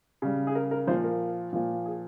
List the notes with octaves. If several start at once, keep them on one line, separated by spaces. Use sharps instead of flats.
C#3 G3
G#4
A#4
A#4
A#2 F3 C5
A#4
A#2 F3
G#4